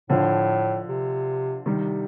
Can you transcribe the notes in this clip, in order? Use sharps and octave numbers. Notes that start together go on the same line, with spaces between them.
A2 D3 F3
C3
C3 D#3 G3